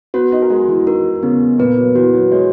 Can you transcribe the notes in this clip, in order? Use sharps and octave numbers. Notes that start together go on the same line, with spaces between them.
B3 F#4 B4
D#4 D#5
A#4
G#3 F#4 G#4
E3 E4
D#3 D#4 A#4
C#3 B3 C#4
A#2 A#3 B4
F#3
E3 F#4
F#3
G#3 C#5